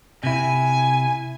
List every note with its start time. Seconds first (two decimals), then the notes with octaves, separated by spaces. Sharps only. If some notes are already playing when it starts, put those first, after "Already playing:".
0.24 C3 E4 G#5